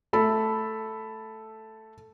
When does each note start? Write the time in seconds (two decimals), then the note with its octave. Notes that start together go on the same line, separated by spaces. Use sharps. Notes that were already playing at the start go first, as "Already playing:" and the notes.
0.13 A3 A4 B5